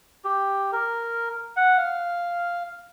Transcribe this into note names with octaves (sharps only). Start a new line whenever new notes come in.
G4
A#4
F#5
F5